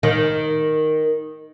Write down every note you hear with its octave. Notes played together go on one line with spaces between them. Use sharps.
D#3